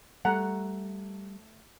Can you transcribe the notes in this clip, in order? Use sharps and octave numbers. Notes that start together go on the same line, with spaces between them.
G3 A3 F#5 A#5